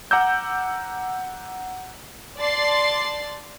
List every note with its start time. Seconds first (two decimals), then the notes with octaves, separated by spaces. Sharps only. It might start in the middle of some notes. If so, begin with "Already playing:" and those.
0.11 F#5 A#5 D6 E6 G6
2.38 D5 A5 C6 A6 C7